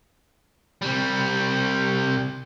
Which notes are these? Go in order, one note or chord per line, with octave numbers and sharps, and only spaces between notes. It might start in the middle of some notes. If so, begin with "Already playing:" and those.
C2 G3